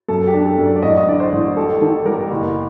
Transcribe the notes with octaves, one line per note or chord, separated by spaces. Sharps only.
F#2 A4
G4
D4
A4
F#2
D5
D5
A1 D#5
D#5
D3 D5
C5
A1
G3 A4
D#3 A4
G3 A#4
F#1